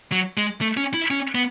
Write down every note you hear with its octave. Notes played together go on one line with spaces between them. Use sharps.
F#3
G#3
A3
C#4
E4
C#4
B3